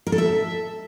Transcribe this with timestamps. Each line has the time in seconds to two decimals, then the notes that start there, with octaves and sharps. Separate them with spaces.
0.07 A#4
0.12 A4
0.18 E5